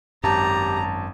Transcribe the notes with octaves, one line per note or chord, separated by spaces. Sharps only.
G#1 F#2 G4 A5 A#5